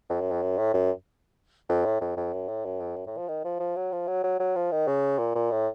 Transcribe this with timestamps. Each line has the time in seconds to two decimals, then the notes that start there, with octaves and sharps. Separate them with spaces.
0.10 F2
0.21 F#2
0.31 F2
0.42 F#2
0.58 A2
0.74 F#2
1.69 F2
1.85 A2
2.01 F2
2.17 F2
2.33 F#2
2.48 A2
2.65 F#2
2.80 F2
2.96 F#2
3.06 A2
3.17 F3
3.28 D#3
3.45 F3
3.60 F3
3.76 F#3
3.92 F3
4.08 F#3
4.24 F#3
4.39 F#3
4.56 F3
4.72 D#3
4.87 C#3
5.19 A#2
5.35 A#2
5.51 A2